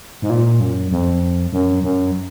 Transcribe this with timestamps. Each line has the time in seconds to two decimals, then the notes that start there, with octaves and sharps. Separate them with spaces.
0.22 G#2
0.30 A#2
0.60 F#2
0.92 F2
1.53 F#2
1.83 F#2